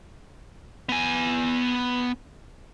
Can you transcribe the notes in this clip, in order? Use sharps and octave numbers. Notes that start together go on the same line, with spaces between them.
B3 G#5